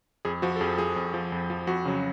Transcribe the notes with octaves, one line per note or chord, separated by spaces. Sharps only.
F2 G#4
F3 F#4
A4
F2 G#4
F3 G#4
F2
F3
F2
F3
F2 F#4
C#3 F#3